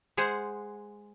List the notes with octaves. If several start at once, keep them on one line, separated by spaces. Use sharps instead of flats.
G#3 G#4 C5 F#5